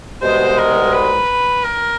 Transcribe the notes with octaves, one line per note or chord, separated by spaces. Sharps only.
C2 B2 G#3 C5
A#4
B4
A#4